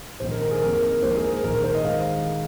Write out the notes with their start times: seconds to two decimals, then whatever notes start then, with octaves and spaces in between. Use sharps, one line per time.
0.20 A#1 G#2 D#3 C5
0.31 A#4
0.42 A#4
0.51 G#4
0.61 F2 D#3 A#3 A#4
1.02 A#1 A#2 G#3 D#4 C5
1.11 A#4
1.17 G#4
1.24 A#4
1.43 A#1 G#2 D#3 A#4
1.54 A#4
1.64 C5
1.75 D#5
1.84 D#3 G#3 F5